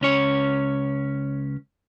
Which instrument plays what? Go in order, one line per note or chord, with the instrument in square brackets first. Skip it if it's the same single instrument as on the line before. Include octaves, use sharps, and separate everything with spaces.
[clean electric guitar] C#2 C#4 C#5